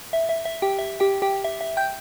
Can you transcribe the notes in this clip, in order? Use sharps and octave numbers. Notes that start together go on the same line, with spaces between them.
E5
E5
E5
G4 G5
E5
G4 G5
G4 G5
E5
E5
G5 G6